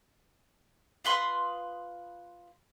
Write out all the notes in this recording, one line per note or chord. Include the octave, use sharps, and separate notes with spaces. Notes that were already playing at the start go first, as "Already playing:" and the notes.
F4 B4 C6 D#6